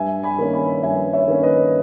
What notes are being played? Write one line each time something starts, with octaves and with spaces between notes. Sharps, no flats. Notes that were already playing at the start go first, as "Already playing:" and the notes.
Already playing: G2 E5 G#5
G#5 B5
D#3 A#3 C#4
G#5 B5
G2 E5 G#5
C#5 E5
D#3 A#3 C#4
B4 D#5